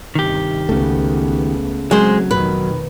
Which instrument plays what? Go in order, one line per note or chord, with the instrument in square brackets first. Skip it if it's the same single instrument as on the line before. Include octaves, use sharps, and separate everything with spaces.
[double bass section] G1 C3 [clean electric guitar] D#3 G4
[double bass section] C#2 B3 [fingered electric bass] C#3 A3
[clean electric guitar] F#3 [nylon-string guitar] G#3 C5 [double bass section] C4
[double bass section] F1 B2 D#3 [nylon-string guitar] B4